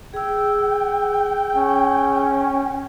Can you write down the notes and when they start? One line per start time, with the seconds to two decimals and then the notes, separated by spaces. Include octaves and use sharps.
0.14 G#4 G5 E6
1.55 C#4